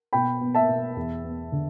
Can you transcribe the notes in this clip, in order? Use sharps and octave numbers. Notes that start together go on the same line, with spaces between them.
B2 G5 B5
B3
E5 A5
B2
E2
B3
D3